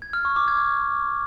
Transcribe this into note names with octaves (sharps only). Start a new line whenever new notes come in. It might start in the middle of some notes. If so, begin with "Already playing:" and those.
G#6
F6
C#6
D6
G#6